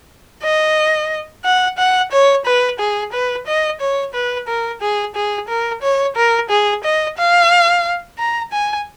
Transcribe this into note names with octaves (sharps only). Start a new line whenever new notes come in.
D#5
F#5
F#5
C#5
B4
G#4
B4
D#5
C#5
B4
A#4
G#4
G#4
A#4
C#5
A#4
G#4
D#5
F5
A#5
G#5